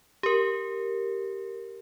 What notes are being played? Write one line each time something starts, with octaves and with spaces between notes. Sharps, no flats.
G4 A#4